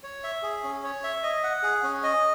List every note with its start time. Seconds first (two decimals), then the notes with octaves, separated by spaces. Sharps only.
0.03 C#5
0.23 E5
0.43 G#4
0.63 C#4
0.84 C#5
1.04 E5
1.23 D#5
1.44 F#5
1.63 G#4
1.83 C#4
2.03 D#5